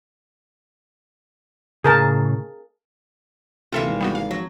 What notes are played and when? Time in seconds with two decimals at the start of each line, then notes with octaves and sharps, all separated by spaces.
1.84 A2 C#3 G#4 A#4 A5
3.72 D2 C3 E3 A#3 F4 A4 E5
3.86 G#1
4.01 G3 B3 F#4
4.15 F5
4.31 F3 F#3